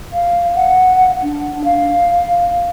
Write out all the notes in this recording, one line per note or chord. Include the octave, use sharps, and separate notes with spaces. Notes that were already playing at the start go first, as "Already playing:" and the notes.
F5
F#5
D4
F5